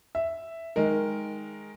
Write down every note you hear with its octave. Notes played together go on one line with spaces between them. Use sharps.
E5
D#3 G#3 A#4